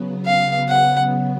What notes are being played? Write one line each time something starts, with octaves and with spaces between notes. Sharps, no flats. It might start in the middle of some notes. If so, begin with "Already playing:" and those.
Already playing: C#3 F#3 B3
F5
F#5